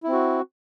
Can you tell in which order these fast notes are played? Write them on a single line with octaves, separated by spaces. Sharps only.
E4 C4 F#4